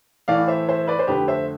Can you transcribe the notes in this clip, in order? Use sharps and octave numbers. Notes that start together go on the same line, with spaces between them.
A2 E3 A3 D5 F5
C5 E5
C5 E5
B4 D5
C5
F2 D3 A3 G4 B4
C5 E5